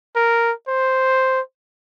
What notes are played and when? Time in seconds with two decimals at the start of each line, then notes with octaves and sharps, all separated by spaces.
0.16 A#4
0.68 C5